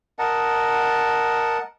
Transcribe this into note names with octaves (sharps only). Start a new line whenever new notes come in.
A#4 D#5 F#5 A5